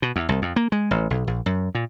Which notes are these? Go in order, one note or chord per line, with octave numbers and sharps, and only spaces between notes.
B2
E2
C2
F2
A#3
G#3
A1
B1
A#1
F#2
A#2